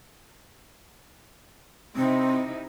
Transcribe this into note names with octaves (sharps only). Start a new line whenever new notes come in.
C3 C4 D#4 E4